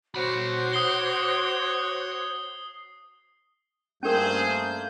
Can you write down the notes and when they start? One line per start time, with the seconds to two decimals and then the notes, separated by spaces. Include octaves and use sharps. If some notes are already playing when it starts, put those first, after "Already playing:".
0.14 F#4 C5 C#5 B5 D6
0.73 D#6 C7 G7
4.03 G2 A3 A#3 C#4 G#4 A#4 C5 G6